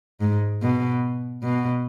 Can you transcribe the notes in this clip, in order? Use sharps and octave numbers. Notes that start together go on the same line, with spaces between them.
G#2
B2
B2